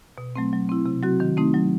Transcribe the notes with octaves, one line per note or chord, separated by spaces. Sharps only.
B2
F#3 A3 C4
F#3
C4 E4
C3
F#3 C4 F#4
D#3
A3 C4 D#4
F#3